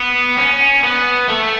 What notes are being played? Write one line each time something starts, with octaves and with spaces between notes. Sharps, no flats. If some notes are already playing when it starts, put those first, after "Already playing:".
Already playing: B3
C#4
B3
A3